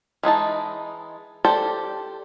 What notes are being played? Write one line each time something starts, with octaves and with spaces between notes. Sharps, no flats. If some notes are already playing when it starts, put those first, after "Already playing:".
E3 G#3 D#4 A5
G4 A4 C5 D5